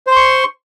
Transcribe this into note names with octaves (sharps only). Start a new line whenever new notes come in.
C5 C6 C#6